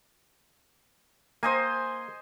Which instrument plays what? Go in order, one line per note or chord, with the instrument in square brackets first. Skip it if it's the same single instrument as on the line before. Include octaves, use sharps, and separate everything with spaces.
[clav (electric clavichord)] A#3 [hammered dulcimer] C5 D#5 G#5